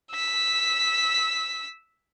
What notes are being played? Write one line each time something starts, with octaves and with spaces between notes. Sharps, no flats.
E6 B6